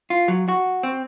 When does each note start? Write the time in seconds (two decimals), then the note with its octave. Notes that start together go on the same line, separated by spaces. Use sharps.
0.10 F4
0.28 F#3
0.48 F#4
0.83 C4